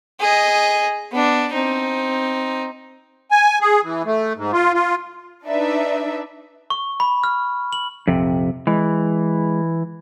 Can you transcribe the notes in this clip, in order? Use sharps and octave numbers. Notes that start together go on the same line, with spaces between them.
G#4 D#5
B3 D4
C4 D#4
G#5
G#4
E3
A3
G#2
F4
F4
D4 D#4 B4 D5 E5
C#6
B5
F6
F#7
A#1 F2 C3
E3 G#3